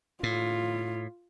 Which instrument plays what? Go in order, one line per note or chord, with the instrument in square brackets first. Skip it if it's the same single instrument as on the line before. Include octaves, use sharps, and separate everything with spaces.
[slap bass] A2 [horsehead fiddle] F4